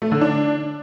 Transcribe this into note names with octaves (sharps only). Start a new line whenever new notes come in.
A3
D3
D4